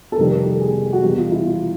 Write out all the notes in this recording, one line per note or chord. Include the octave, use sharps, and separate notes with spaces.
A4
F2 C3 D#3 G3 A#4
A#4
A4
G#4
F#4
E2 B2 G3 G4
F4
E4
F4